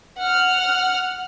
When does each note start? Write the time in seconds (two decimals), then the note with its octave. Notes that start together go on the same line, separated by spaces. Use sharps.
0.18 F#5 F6